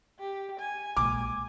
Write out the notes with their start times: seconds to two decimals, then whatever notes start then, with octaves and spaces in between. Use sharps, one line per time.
0.20 G4
0.60 G#5
0.97 A#1 G#3 D6